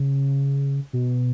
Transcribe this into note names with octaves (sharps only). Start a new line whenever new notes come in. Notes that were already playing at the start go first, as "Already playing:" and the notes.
Already playing: C#3
B2